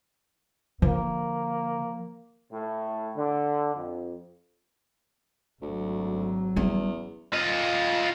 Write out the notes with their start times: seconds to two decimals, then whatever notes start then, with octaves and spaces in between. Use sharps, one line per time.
0.82 D3 F3 A#3
2.52 A2
3.16 D3
3.76 F2
5.62 G#1 D2 F#3
6.56 E2 G3 C#4
7.34 F4 D#5